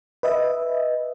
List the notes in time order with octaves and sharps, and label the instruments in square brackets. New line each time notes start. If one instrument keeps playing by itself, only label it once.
[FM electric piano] B4 D#5 E5